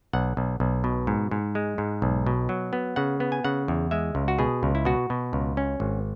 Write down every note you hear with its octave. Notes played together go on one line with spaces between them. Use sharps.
B1 F#5
B1
B1
B2
G#2
G#2
G#3
G#2
B1
B2
F#3
B3
C#3 F#5
B3
G#5
C#3 F#5
E2
G#3 E5
C#2
F#4
B2 G#4
C#2
E4
B2 F#4
B2
C#2
C#4
G#1